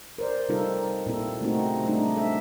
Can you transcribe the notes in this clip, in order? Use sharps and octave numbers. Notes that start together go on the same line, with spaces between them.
A#4 C5 D5
C3 G3 D#4 F4 A4 A#4
A#2 C4 E4 A4
C#3 A3 A#3 C4 D#4 F#4
F#3 G3 A3 D4 D#4
A4 E5